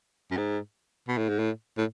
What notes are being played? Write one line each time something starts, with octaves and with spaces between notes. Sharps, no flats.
F#2
G#2
B2
A2
G#2
A2
A2